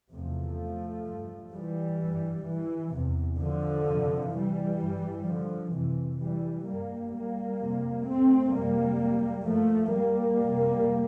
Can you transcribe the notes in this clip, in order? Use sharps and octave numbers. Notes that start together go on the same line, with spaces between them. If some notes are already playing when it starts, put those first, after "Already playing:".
E2 C3 F3 A3
G2
E3 G3
G2
E3
E2 C3
D3 F3
F2 C3
E3 G3
G2
D3 F3
F2 C3 E3
E3 G3
G2 G3 A#3
G3 A#3
F2 C3
A3 C4
F2 C3 G3 A#3
G2 F3 A3
G3 A#3
F2 C3